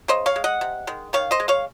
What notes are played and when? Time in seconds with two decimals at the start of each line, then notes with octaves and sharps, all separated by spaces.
0.08 C#3 C5 D#5
0.26 C#5 F5
0.36 G#3
0.44 D#5 F#5
0.61 C3
0.87 D#3 G#3
1.13 D#3 C#5 F5
1.31 C5 D#5
1.40 G#3
1.48 C#5 F5